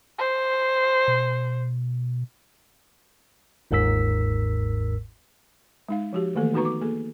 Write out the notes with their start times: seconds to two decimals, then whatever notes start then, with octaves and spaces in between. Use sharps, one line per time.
0.19 C5
1.08 B2
3.71 G1 D#2 G#2 A#4 E6 B6
5.89 G#3 D#4 F5
6.13 F3 F#4 G4
6.35 D#3 E3 A3 A#3 A4
6.53 B3 D#4 F#4 B4 A#5 C#6
6.65 D6
6.81 A#3 G#4 A4